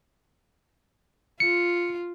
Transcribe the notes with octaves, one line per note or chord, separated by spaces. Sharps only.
F4 C#7